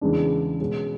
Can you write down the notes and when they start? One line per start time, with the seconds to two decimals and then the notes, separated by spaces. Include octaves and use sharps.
0.01 E2 C#3 G#3 D4
0.60 B2 G#3 C#4